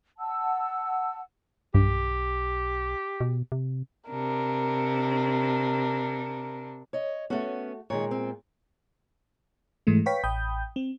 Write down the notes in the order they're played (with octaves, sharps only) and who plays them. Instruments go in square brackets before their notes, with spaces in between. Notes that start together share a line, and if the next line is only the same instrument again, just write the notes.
[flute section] F#5 A5 E6
[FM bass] B1 [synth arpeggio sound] G2 [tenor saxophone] G4
[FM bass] B2
C3
[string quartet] C3 D4 [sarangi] A#4
[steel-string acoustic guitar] C#5 D#5
[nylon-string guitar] A3 F#4 [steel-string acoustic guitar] B3 C#4
[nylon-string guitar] A#2 G#3 [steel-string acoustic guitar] D#3 C#5
[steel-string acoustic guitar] C4
[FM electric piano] G#2 E3 G#3 A3
B4 C#5 F5 G5 C#6 B6
A1 G5 B5 D#6 G6
C4